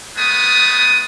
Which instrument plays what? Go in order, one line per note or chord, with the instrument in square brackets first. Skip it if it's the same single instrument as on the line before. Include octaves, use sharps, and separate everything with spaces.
[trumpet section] G#3 A3 B3 D#6